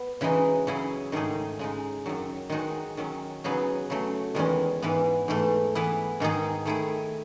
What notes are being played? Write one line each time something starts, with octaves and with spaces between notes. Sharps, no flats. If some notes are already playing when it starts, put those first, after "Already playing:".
Already playing: B3
C#3 E3 G#3 D#4 F#4
C#3 F#3 C#4 E4 G#4
G#2 D#3 A3 D#4 G#4
C#3 G#3 D#4
F#2 D#3 F#3
D#3 G#3 D#4 F#4
D#3 F#3 C#4
C#3 F#3 B3 D#4 G#4
C#3 F#3 A3
E2 D#3 G#3 C#4
G#2 E3 B3
G#2 E3 A3
E3 B3 E4
G#2 D#3 G#3 D#4 G#4
D#3 A3 E4 G#4